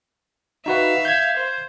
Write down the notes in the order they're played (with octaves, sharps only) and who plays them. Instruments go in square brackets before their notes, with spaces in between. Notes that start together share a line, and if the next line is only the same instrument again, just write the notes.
[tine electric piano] D#4 F#4 B4 [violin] E5 F5
[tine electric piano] G6 G#6
[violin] C5